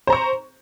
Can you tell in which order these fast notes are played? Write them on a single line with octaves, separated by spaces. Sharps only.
C5 A#5 C#6